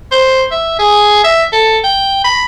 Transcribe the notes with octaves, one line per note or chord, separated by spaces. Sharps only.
C5
E5
G#4
E5
A4
G5
B5